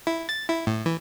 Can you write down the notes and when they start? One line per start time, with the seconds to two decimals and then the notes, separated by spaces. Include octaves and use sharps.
0.07 E4
0.29 A6
0.49 E4
0.67 A2
0.86 E3